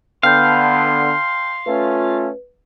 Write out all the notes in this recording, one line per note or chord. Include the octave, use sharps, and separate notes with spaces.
D3 B3 F5 G5 A5 C6 G6
A3 C#4 F4 B4